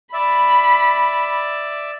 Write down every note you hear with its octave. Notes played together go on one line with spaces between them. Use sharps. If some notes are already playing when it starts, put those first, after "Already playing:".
D5 E5 B5